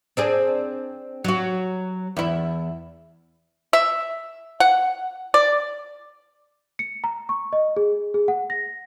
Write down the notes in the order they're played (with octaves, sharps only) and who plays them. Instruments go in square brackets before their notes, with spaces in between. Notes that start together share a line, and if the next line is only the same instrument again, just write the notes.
[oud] C4 D4 G#4
F#3 F#4
E2 E4
[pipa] E5
F#5
D5
[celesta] C#7
A#5
C#6
D#5
G#4
G#4
F#5
A#6